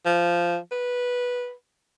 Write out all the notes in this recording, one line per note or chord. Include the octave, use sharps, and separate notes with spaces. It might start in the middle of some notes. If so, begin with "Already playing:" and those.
F3
B4